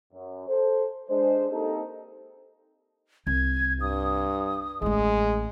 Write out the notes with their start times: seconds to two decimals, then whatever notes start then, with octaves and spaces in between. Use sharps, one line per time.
0.13 F#2
0.48 A4 C5
1.09 G#3 D4 C5
1.51 A#3 C4 D#4 G4 A4
3.27 C2 G#6
3.81 G2 D#6
4.82 A1 G#3 A3